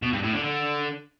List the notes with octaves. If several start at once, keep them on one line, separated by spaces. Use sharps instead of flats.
B2
G2
A2
D3
D3